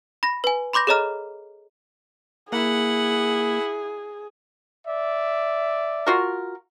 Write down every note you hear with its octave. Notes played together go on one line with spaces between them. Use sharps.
B5 A#6
B4 G#5
B5 C6 D6 G6 A#6
G#4 A4 C#5 D#5 A#5 F6
A#3 E4 G#4 F#5
D5 E5
F4 F#4 A#4